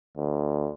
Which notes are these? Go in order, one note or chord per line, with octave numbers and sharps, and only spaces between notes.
D2